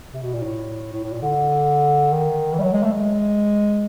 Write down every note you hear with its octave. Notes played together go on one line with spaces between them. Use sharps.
C3
B2
A#2
A2
A2
A2
A#2
D3
D#3
E3
G3
F#3
G#3
A3
G#3